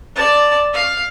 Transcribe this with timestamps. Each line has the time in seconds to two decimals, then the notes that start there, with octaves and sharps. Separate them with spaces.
0.15 D5 A5
0.74 F5